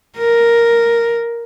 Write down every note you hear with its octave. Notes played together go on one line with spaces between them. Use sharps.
A#4